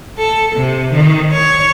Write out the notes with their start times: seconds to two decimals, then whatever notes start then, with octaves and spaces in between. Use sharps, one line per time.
0.18 A4
0.56 C3
0.93 D#3
1.33 C#5